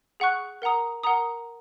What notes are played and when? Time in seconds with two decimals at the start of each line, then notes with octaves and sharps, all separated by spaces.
0.20 G#4 F#5 C#6 F#6
0.62 A#4 F#5 A#5 D#6
1.03 A#4 F#5 A#5 D#6